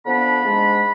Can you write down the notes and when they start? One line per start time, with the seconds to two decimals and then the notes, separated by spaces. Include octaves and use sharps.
0.06 D3 F3 B3 D4 B5
0.44 G#2 G#3 D4